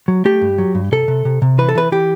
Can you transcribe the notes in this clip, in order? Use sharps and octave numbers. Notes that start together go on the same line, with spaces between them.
F#3
A3 G4
G2
F#3
G2
C3 A4
C3
C3
C3
E3 B4
A4
E3 B4
E3 G4